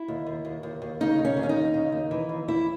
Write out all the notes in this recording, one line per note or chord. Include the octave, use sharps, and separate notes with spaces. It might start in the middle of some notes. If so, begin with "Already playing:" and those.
Already playing: E4
D#2
D#2
D#2
D#2
D#2
C#3 D#4
D#2
C#4
D#2
C#4
D#4
D#2
C#3
D#2
E3
D#2
E2 E4